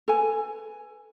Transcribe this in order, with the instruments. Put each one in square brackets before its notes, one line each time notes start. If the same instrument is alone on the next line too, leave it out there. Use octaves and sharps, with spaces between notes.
[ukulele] A4 B4 G#5